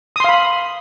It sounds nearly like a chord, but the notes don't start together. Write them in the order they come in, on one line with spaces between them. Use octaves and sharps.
D#6 C6 F5 B5